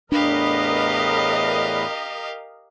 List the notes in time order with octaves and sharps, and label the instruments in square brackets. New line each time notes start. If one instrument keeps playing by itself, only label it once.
[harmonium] E2 A2 B4 [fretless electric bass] D4 [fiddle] G4 F5 [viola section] A#4 D#5